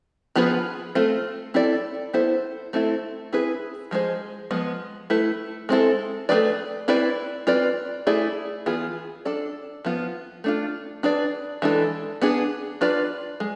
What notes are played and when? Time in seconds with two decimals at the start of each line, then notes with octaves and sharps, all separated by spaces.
0.36 F3 B3 F4 G#4 B4
0.95 A3 C4 F4
1.54 C4 E4 A4 D5
2.13 B3 E4 A4 C5
2.73 A3 C4 E4 A4
3.33 C4 E4 G#4 B4
3.91 F3 G#3 D4 G#4 C5
4.51 F3 G#3 B3
5.10 A3 E4 B4
5.69 G#3 C4 E4 A4
6.29 A3 C4 G#4 B4 D5
6.88 C4 E4 B4 D5
7.47 C4 F4 B4 D5
8.07 A3 E4 G#4 D5
8.66 E3 B3 F4 G#4
9.25 D4 A4 D5
9.85 F3 B3 F4
10.44 A3 D4 F4
11.03 D4 G#4 B4 D5
11.62 E3 G#3 D4 A4
12.22 B3 D4 G#4
12.81 D4 F4 B4 D5
13.40 G#3